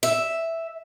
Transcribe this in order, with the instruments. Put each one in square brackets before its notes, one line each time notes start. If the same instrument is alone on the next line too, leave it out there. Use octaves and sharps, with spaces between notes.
[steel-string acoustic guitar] E5